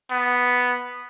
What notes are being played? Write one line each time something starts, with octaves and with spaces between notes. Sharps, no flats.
B3